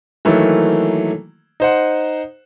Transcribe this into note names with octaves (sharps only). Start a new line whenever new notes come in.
D#3 E3 F#3 A3 A#3
D#4 C5 F#5